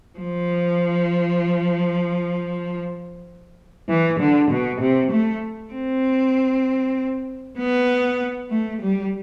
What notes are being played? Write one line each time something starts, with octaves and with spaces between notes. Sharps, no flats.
F3
E3
D3
B2
C3
A3
C4
B3
A3
G3